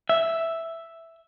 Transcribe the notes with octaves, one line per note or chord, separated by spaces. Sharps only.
E5